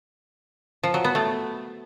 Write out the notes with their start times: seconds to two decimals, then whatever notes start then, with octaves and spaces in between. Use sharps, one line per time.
0.83 F3
0.94 F#3
1.04 B3
1.15 A3